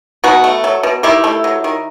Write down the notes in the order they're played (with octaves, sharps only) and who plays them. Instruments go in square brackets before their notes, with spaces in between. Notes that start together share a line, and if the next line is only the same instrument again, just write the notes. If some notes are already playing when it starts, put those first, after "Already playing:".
[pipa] B2 D#4 F#4
A3
F#3
B2
D#3 E4 G4
A3
F#3
D#3